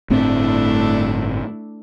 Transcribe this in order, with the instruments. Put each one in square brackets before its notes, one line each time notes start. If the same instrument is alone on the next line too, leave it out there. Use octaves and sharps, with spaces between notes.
[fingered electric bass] G1 A2 C4 [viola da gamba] A3 D4 E4